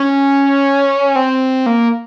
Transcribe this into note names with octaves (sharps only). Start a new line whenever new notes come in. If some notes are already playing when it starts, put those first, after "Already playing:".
Already playing: C#4
C4
A#3